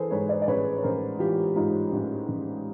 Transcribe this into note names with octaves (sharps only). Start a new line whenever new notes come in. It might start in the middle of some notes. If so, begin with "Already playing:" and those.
Already playing: E3 G#4 A4 B4 C5
G#2 B4 C#5
C5 D5
D5
A1 B4 C#5
C#5
A1 A#4 C5
E3 F4 G4
G#2 D#4 F4
A1
A1